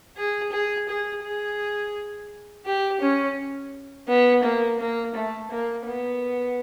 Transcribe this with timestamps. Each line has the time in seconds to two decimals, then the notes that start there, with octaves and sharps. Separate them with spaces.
0.17 G#4
0.52 G#4
0.88 G#4
1.23 G#4
2.65 G4
3.01 C#4
4.08 B3
4.43 A#3
4.79 A#3
5.15 A3
5.51 A#3
5.86 B3